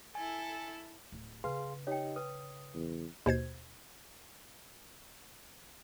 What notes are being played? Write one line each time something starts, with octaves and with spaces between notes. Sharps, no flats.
E4 A4 G#5
D1
C#3 G#4 B4 F5 C6
D#4 G4 C#5 D#5 G5
B4 D#6
E2
D#2 B2 C5 G#6